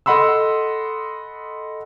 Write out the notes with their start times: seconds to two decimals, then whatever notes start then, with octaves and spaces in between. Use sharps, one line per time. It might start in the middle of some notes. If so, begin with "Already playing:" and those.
0.06 A4 D#5 F#5 B5 C6 E6